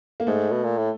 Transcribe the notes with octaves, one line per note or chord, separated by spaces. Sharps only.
A#3
G#2 A3
B2
A#2
A2